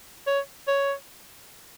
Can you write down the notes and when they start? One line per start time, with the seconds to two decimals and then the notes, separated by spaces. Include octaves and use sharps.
0.27 C#5
0.67 C#5